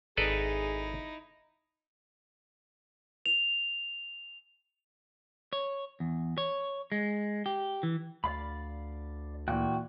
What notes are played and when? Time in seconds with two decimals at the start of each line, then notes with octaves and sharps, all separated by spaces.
0.17 G#1 D#4 E4 G#4 A4 B4 D5
3.26 F7
5.53 C#5
6.00 E2
6.38 C#5
6.92 G#3
7.46 G4
7.83 E3
8.24 D2 D5 F5 B5
9.48 A#2 E3 F#4 G5 F#6